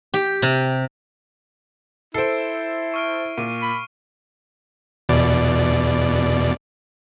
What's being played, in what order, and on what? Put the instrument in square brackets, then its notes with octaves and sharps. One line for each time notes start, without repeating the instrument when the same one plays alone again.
[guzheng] G4
C3
[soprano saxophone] E4 [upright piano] A4 C5 [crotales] C7 D7
[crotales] C#6 F6 D7
[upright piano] A#2 [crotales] D#7
[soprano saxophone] B5
[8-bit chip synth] E2 B2 D5